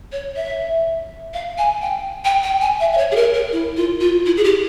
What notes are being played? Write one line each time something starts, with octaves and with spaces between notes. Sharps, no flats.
C#5
E5
F5
G#5
G5
G5
G5
G#5
E5
E5
C#5
G#4
A#4
A#4
E4
F4
F4
E4
G#4
G4